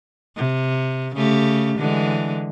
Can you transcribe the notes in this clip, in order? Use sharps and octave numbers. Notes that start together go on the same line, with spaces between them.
C3
C#3 A3 G4
D3 E3 G#3